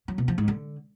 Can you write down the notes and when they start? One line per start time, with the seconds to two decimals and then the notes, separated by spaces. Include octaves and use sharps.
0.08 F#3
0.18 B2
0.28 F3
0.38 G#2
0.48 D3